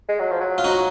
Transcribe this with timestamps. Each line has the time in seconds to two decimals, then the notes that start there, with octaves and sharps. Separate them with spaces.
0.09 G#3
0.19 F#3
0.30 F3
0.41 F#3
0.58 F4
0.64 D#4 F#4